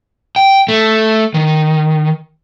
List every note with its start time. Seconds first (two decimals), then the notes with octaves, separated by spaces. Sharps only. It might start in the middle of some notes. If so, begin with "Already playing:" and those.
0.36 G5
0.68 A3
1.34 D#3